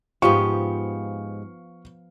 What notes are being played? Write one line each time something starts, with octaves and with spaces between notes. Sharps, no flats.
G#2 F3 B3 G4 F5 G#5 C#6